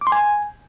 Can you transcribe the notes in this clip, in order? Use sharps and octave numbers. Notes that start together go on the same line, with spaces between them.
D6
C6
G#5